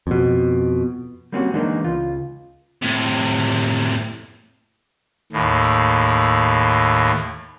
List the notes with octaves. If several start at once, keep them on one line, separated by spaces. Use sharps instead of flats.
F2 B2
G3 A#3 C4 C#4 F4 F#4
E3 G#3 A#3 B3 D4 D#4
C#2 F4
A2 C3
D#2 A2